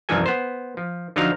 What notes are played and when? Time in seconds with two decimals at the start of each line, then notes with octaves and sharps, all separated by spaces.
0.09 C2 F#2 E3 F3 A4 G#5
0.26 B3 C5
0.77 F3
1.16 D3 F3 F#3 D#4 F5